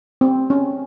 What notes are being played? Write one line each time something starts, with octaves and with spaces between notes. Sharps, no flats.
C4
C#4